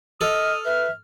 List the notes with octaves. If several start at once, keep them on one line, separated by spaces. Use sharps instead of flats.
A4 D#5 D#6 F6
B4 E5